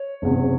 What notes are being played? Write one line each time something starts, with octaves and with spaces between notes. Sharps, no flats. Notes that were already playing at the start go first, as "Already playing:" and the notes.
Already playing: C#5
F#1 E2 C3